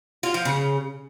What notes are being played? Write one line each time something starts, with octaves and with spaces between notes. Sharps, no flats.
F4
F3
C#3